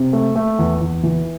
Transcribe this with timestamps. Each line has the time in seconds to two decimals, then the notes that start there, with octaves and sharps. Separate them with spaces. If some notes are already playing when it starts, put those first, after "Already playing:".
Already playing: C3
0.13 A3
0.36 A3
0.59 E2
0.81 E2
1.03 E3